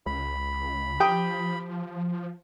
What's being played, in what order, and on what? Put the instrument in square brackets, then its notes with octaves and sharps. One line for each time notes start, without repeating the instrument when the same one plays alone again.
[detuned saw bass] C#2 [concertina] B5
[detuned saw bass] F3 [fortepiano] G4 G5 D#6